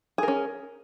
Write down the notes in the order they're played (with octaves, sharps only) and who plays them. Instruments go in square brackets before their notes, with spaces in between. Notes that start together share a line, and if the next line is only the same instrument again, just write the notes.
[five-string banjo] G#4
A#4
C#4